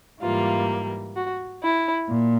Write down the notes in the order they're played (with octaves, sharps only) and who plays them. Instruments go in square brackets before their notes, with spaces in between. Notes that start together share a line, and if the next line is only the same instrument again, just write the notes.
[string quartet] G#2 E3 G3 A#3 F4
F#4
E4
A#2